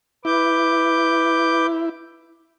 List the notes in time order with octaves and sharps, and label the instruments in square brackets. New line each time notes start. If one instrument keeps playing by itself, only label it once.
[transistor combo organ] E4 [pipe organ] B4 D6 G6